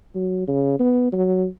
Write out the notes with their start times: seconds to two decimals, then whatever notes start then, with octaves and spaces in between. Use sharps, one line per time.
0.15 F#3
0.48 C#3
0.80 B3
1.13 F#3